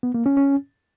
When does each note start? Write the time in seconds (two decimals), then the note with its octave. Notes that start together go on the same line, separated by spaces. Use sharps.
0.03 B3
0.14 A#3
0.26 C#4
0.37 C#4